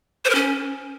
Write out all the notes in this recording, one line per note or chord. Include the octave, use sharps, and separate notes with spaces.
C5
A#4
C#4